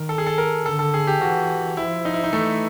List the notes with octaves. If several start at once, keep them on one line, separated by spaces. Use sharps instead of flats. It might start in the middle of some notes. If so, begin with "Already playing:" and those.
Already playing: D#3 A#4
A4
G#4
A4
A#4
D3 A4
A4
G#4
G4
E3 F#4
F3 E4
D#4
E4
D#4
E3 A3